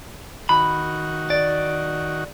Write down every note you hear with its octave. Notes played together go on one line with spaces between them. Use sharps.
D#3 F#4 B5
D5